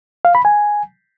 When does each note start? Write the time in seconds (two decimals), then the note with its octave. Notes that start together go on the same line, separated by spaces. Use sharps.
0.25 F5
0.35 B5
0.45 G#5